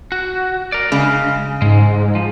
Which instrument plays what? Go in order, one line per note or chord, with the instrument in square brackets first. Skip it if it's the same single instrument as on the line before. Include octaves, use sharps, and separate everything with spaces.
[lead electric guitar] F#4
A#4 D5
[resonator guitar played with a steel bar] C#3 [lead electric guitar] G#3
[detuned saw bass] G#2 [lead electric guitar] G#3
[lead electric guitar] F3